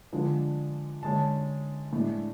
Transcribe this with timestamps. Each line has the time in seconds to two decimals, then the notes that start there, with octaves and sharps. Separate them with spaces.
0.13 D3 F3 G#3 D4
1.03 D3 G#3 C#4 A5
1.93 A2 G#3 D4